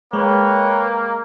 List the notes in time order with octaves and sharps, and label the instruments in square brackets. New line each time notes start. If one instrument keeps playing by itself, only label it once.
[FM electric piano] G#3 [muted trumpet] A#3 [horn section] B4 C#5 G5